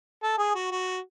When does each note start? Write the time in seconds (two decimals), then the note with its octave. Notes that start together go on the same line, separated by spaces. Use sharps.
0.23 A4
0.39 G#4
0.55 F#4
0.71 F#4